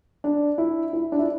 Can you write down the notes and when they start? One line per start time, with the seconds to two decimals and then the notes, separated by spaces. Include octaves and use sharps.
0.24 D4
0.58 E4
0.93 E4
1.12 D4
1.19 E4